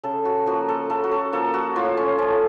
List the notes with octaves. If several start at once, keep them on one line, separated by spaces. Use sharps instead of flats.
C#3 A4
F#4
F3 A#3 F#4
A4
C#3 A4
F#4
A4
F3 A#3 A4
F#4
A2 F4
C#4
F3 A3 C#4